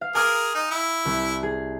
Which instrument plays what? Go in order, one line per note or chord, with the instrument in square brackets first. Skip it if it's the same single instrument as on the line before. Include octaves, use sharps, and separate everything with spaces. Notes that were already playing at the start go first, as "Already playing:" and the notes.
[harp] F5
[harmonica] G#4 A#4 [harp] G#5 D6 F6
[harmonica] D#4
E4
[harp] C2
G#4